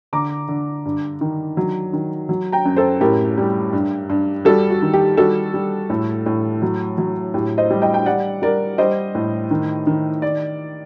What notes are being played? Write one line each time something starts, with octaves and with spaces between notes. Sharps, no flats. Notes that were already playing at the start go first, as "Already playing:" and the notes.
D3 A#5 D6
D3
G2
D#3
F#3
D#3
F#3
G5 A#5
F#2
A4 C5
A2 G4 A#4
G3
G2
G2
G3 F#4 A4
F#4
D#3
G4
G3 F#4 A4
G3
A2
A2
F#3
F#3
A2 G4
C5 D#5
G3
D#5 G5
G5
G3 D5 F#5
G3 A#4 D5
G3 C5 D#5
A2
D#3
D#3
D5